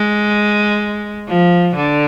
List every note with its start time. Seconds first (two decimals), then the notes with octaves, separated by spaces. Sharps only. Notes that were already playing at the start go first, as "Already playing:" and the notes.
Already playing: G#3
1.28 F3
1.75 D3